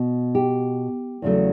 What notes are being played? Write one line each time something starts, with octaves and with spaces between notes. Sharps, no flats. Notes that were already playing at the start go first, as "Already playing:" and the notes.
Already playing: B2
G4
E2 C#3 F#3 A3